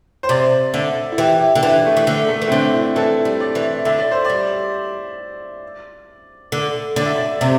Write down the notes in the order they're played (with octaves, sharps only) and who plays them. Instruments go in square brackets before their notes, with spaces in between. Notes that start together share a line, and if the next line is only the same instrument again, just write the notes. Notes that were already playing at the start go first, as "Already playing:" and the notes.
[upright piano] C5
[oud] C3 [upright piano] D5
[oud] D3 [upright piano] E5
[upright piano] E4
[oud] E3 [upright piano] G4
[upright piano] G4
[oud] D3
[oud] E3 [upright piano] D4
[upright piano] A3
[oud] E3
[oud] D3 [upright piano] A3
[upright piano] A3
[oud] E3
[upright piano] C4
[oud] D3 [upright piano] D4
[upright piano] E4
[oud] E3 [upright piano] A4
[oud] G3
[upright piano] D5
[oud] E3
[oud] D3 [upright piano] E5
[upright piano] D5
C5
D5
[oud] G3
D3
[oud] D3 [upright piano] D5
[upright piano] E5
D5
[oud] C3 [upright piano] E5